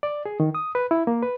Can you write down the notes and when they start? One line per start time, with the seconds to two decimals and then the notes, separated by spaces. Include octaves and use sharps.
0.03 D5
0.26 G#4
0.40 D#3
0.55 D#6
0.75 B4
0.91 E4
1.07 A#3
1.23 B4